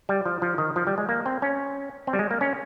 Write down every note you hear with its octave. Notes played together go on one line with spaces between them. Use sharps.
G3
F3
F3
D#3
F3
G3
G#3
A#3
C4
C#4
C4
G3
G#3
A#3
C#4